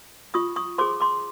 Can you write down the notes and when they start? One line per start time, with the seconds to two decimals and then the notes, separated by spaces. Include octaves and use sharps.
0.34 F4 C#6 D#6
0.56 C#6 D#6
0.78 G#4 C5 C6 D6
1.00 C6 D6